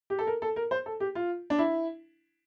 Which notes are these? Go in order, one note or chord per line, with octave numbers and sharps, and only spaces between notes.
G4
A4
A#4
A4
A#4
C5
A4
G4
F4
D4
E4